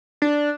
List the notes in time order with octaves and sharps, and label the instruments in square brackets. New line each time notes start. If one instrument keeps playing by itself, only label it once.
[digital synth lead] D4